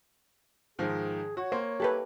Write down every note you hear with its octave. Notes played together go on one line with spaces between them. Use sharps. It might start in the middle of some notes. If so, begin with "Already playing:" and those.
G#2 D#3 F3 G#4
F#4 C#5
A#3 C5
G4 A4 B4